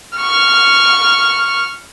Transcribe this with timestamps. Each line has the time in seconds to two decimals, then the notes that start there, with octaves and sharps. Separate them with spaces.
0.17 C#6 F6